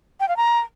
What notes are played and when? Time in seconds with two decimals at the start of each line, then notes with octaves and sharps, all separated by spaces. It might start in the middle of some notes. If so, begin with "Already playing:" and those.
0.20 G5
0.28 F5
0.37 A#5